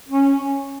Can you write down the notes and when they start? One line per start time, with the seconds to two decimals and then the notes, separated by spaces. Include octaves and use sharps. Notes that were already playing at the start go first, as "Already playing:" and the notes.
0.09 C#4